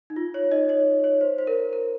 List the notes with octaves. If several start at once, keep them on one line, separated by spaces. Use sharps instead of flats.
D#4
F4
C#5
D#4 D#5
C#5
C#5
C5
C5
A#4
A#4